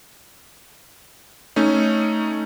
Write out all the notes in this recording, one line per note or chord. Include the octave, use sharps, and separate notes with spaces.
A3 C#4 D#4